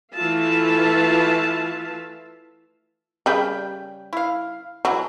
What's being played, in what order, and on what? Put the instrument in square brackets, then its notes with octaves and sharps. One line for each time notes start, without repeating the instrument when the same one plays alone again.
[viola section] E3 A3 F4 E5 F5 A5
[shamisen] C#3 G3 [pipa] A#4 G5
[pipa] E4 F5
[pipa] B2 E3 [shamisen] F#3